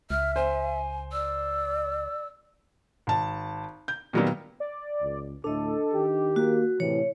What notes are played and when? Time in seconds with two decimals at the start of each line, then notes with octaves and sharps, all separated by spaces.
0.10 C#2 E5 F6
0.36 C5 G#5
1.12 D5 E6
3.07 G#1 A5
3.88 G6
4.13 A#2 D#3 F#3 G3 A#3 B3
4.60 D5
5.02 C#2
5.44 D2 A2 D4 A4 D#5
5.93 D#3 G4
6.36 A#3 F#4
6.80 A2 C3 E3 C#5